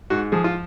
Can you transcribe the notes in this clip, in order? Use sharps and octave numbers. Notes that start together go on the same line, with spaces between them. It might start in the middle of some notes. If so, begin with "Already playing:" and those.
G#2 F#4
F3 G#4
F4